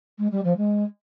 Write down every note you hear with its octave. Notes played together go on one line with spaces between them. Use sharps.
G#3
G3
F3
G#3